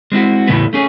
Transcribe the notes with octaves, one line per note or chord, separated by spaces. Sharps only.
G#3 C4 E4 F#4
E2 A2 C#3 A3 E4 B4
A3 C#4 G#4